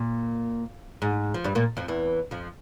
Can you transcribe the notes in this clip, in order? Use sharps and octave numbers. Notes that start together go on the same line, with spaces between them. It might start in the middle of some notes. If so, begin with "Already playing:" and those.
Already playing: A#2
G#2
F3
G2 G3
A#2 A#3
F2 F3
E2 E3
F2 F3